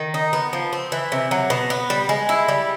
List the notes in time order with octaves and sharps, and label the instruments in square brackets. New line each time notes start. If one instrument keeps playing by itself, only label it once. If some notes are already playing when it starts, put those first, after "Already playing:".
Already playing: [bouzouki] D#3
D#4
B3
F3
C4
E3
C3
F#3
B2
B3
G3
G#3
E4
G3